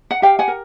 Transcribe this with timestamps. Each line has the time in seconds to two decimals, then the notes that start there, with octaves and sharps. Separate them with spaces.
0.11 F#5
0.22 G4 F5 G5
0.39 F#5 G#5
0.48 A#4